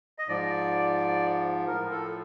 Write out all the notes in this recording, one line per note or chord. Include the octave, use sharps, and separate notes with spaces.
D#5
G#2 F3 D5
A2 F3 A#4
A4